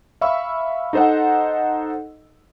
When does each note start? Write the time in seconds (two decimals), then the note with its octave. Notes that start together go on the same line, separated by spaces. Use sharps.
0.21 E5 F5 B5 C#6 E6
0.93 D#4 A4 C5 D#5 F#5